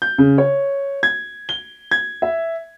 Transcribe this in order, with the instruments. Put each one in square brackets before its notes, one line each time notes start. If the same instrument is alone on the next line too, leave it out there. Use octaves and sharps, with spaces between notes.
[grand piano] G6
C#3
C#5
G#6
G7
G#6
E5